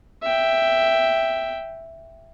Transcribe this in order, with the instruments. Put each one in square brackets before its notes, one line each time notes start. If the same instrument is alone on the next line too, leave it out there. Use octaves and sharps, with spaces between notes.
[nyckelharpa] E5 G5